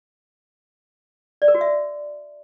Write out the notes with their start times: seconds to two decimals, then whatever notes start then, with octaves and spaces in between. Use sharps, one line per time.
1.42 D5
1.48 A#4
1.55 F#4
1.61 E5